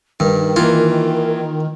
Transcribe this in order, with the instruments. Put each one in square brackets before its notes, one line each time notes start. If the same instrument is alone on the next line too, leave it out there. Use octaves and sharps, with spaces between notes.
[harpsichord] G2 [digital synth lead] D#3 [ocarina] A#4
[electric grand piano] E3 A#3 [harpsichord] F4